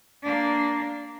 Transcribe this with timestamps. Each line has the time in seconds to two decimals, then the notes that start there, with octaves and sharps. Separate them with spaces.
0.23 A#3 D4